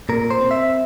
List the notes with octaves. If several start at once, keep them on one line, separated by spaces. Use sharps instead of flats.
A#2 A#4
C5
C4
E5